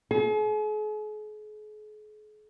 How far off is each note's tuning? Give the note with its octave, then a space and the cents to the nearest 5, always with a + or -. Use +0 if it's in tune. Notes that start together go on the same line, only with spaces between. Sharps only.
G#4 +40